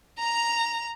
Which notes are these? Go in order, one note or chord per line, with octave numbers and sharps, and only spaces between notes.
A#5 F7